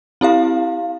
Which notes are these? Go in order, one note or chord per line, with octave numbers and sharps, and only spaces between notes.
C4 E4 G4 F5